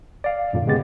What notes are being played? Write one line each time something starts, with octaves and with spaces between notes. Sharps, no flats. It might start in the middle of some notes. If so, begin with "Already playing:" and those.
D5 F5
F#2 A#2 D3
C#3 G#3 B3 G4 A6